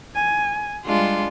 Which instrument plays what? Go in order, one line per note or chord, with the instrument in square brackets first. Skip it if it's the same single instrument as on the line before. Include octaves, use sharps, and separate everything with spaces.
[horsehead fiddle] G#5
[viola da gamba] G3 G#3 F4 [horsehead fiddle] D4